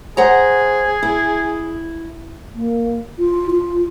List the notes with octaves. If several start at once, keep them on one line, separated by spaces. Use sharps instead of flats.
G#4 C5 F#5 A#5
E4
A#3
F4
F4